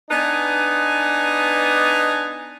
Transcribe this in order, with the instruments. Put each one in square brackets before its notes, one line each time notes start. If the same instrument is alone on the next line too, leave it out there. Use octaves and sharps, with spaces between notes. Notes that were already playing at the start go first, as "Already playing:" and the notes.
[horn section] B3 D4 D#4 B4 G#5